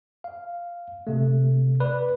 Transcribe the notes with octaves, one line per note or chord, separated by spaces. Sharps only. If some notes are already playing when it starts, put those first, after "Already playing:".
F5
C3 A3
B4 D5